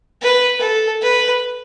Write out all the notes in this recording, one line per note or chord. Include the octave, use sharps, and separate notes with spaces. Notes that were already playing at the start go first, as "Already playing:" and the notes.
B4
A4
B4